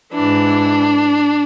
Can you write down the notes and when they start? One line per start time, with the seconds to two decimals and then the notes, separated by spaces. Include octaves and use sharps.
0.14 G#2 E3 D4